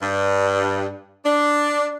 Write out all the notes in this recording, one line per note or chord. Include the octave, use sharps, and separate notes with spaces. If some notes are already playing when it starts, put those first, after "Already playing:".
G2
D4